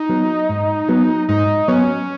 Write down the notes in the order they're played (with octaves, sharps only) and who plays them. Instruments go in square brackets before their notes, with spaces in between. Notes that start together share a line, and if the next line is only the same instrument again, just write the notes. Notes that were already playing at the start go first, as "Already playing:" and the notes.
Already playing: [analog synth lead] D#4
[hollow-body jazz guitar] F#3 B3
G#2
F#3 B3
[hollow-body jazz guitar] G#2 [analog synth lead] D#4
[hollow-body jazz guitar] F#3 B3 [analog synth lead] C#4